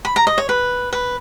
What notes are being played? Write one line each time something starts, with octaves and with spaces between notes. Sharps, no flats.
B5
A#5
D#5
C#5
B4
B4